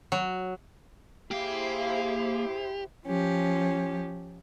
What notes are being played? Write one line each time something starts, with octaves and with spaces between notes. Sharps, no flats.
F#3
A#3 E4 G4 G#4 C5 F5
F3 C#4 G4